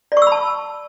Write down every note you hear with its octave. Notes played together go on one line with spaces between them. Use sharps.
D5
C#6
E6
B5
A5